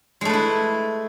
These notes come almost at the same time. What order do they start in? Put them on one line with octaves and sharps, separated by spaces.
G#3 A3 B4 E4